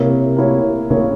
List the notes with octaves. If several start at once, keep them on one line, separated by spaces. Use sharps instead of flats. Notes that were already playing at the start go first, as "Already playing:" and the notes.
Already playing: C3 A#3 E4 A#4 C#5
A#3 E4 A#4 C#5
C#3 A#3 E4 A#4 C#5